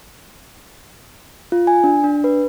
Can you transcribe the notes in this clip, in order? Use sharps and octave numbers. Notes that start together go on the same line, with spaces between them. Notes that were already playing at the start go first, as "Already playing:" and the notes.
F4
G#5
D4
D4
B4